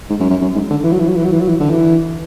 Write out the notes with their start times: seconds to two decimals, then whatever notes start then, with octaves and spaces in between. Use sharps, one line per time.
0.09 G#2
0.20 F#2
0.30 F#2
0.42 F#2
0.55 G#2
0.70 D3
0.83 E3
0.92 F#3
1.00 E3
1.08 F#3
1.16 E3
1.24 F#3
1.32 E3
1.40 F#3
1.48 E3
1.60 D3
1.70 E3